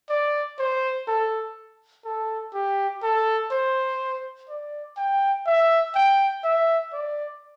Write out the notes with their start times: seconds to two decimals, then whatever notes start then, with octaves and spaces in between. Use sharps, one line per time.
0.10 D5
0.59 C5
1.08 A4
2.05 A4
2.54 G4
3.03 A4
3.51 C5
4.49 D5
4.97 G5
5.46 E5
5.95 G5
6.44 E5
6.93 D5